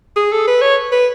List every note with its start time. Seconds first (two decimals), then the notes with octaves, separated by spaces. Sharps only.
0.16 G#4
0.32 A4
0.47 B4
0.62 C#5
0.92 B4